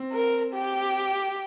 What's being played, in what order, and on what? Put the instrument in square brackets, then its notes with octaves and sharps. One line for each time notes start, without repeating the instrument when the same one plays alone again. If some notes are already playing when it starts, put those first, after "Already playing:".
Already playing: [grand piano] C4
[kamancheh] A#4
G4